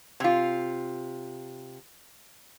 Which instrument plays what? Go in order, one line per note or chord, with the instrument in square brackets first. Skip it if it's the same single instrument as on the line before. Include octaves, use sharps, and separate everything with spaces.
[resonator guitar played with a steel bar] C3 F4